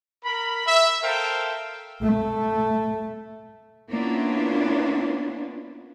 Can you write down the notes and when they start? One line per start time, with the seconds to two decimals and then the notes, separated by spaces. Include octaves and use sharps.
0.25 A#4 B5
0.66 E5
1.03 A4 A#4 C5 F5 G5
2.01 A3
3.91 A#3 B3 C#4 D4 E4 F4